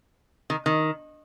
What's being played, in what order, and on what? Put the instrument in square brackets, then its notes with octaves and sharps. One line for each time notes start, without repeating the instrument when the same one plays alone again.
[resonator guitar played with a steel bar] D#3
D#3